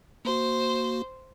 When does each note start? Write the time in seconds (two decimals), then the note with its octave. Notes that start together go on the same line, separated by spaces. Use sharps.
0.25 A#3 F#4 C5